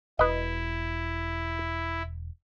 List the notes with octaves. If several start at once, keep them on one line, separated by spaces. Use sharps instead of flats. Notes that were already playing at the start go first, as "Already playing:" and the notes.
E1 E4 B4 D#5